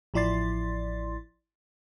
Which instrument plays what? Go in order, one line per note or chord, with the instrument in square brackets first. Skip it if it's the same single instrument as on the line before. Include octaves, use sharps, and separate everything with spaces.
[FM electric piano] A1 F3 E4 D5 C6 A6